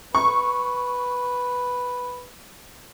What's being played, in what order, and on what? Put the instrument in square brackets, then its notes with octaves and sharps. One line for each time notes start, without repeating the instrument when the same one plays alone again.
[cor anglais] B4 [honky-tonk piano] C#6